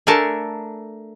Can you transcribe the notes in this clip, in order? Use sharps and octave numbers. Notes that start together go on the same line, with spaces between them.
A3 D4 A4 A#4 G#5 A5